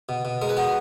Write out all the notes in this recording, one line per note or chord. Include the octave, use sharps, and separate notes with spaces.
B2
B2
G#3 A#4
B4
B3 F#4 A#4